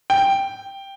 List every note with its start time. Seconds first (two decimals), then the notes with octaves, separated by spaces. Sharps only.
0.10 G5